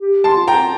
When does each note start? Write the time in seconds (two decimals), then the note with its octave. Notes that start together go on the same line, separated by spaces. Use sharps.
0.01 G4
0.24 A5 C6
0.37 F4
0.48 G5 A#5